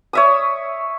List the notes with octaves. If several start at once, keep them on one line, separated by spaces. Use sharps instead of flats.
C#5 E5 D#6